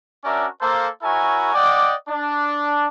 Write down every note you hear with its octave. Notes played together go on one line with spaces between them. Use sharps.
C#4 D4 F#4 A#4 D5 E5
A#3 A4 C5
E4 F#4 A#4 C#5 E5 G#5
D5 D#5 F#5 G5 D6
D4